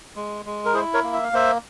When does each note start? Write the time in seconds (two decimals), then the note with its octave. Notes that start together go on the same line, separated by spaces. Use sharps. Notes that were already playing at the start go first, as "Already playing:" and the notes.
0.16 G#3
0.46 G#3
0.65 A#4
0.74 E4 G#4 C5
0.94 A#4 C#5
1.03 A#3
1.13 E5
1.23 F5
1.33 A#3 C5 E5